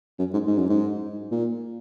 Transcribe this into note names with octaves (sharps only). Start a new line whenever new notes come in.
F#2
G#2
G#2
F#2
G#2
A#2